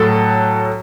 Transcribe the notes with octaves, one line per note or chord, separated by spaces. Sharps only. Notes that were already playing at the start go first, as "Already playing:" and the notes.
Already playing: A2 F#3 A4